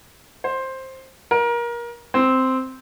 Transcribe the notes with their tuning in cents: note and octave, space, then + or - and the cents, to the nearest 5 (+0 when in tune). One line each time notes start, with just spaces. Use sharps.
C5 +10
A#4 +25
C4 -5